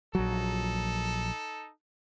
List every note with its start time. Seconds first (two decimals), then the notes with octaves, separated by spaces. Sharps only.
0.15 A#1 F#3 D#4 A4